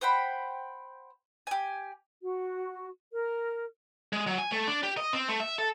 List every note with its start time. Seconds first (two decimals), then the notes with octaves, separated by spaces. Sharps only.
0.01 C5 F#5 G5 B5
1.47 G4 G#5
2.22 F#4
3.12 A#4
4.13 G#3
4.27 F#3
4.38 G#5
4.52 A3
4.67 D4
4.83 G4
4.97 D#5
5.13 C4
5.28 A3
5.40 E5
5.58 A4